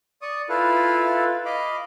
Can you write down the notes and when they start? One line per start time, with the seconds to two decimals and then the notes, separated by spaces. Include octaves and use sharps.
0.22 D5 C#6 D#6
0.49 E4 F4 A4 B4 F5
1.45 D#5 F5 B5 D6